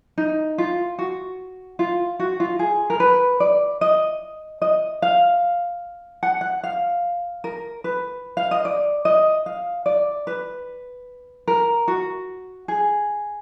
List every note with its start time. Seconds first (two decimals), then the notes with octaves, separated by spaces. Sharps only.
0.18 D#4
0.58 F4
0.99 F#4
1.79 F4
2.20 F#4
2.40 F4
2.59 G#4
2.90 A#4
3.00 B4
3.40 D5
3.81 D#5
4.62 D#5
5.02 F5
6.23 F#5
6.41 F#5
6.64 F5
7.44 A#4
7.84 B4
8.37 F5
8.51 D#5
8.65 D5
9.05 D#5
9.46 F5
9.86 D5
10.27 B4
11.48 A#4
11.88 F#4
12.68 G#4